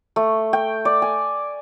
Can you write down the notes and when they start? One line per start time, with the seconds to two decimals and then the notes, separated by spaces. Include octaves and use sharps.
0.16 A3
0.53 G5
0.85 D5
1.02 G#5